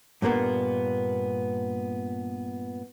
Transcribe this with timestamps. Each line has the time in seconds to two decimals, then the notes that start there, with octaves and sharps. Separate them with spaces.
0.22 G2 A#2 A#3 B3